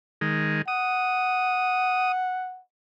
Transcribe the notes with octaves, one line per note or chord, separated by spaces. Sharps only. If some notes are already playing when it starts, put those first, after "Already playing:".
D#3 G#3
F#5 D#6